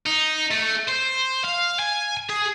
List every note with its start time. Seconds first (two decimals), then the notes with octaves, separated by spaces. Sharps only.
0.06 D#4
0.51 A3
0.89 C5
1.45 F5
1.79 G#5
2.30 G#4